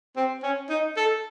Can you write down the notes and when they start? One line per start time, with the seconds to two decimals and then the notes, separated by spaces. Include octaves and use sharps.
0.17 C4
0.43 C#4
0.70 D#4
0.97 A4